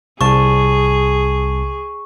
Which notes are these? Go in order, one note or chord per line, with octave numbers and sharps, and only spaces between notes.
C2 G#4 A5 C#6